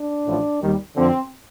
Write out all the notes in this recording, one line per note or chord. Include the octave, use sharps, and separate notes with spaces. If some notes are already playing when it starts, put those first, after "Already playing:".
Already playing: D4
A1 A2 F3
D#2 D#3 G3
F2 D3 F3 C4